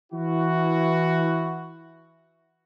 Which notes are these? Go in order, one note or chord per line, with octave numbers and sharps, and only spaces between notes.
E3 E4 F#4